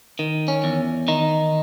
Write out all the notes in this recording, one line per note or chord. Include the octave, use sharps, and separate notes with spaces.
D#3
C#4
E2
D#3 D#4